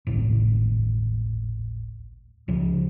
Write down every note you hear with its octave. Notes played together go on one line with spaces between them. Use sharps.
D#1 G#1 C#2 A2
C#2 C#3 F3